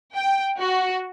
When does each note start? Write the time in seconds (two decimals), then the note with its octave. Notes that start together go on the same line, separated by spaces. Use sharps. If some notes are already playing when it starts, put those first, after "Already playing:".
0.16 G5
0.59 F#4